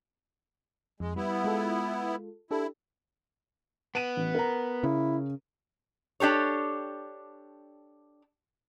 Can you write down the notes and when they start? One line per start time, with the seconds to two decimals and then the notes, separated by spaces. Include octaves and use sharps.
1.00 F2 G#3
1.16 G3 B3 E4
1.44 G#3 F4 A4
2.51 D4 E4 G4 A4
3.95 B3 D7 D#7
4.17 A1
4.35 A#4 A#5
4.83 C#3 E4
6.20 D4 G4 A4 C#5